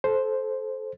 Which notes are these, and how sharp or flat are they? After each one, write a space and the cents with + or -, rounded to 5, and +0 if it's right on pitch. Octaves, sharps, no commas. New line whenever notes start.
A4 -20 C5 +0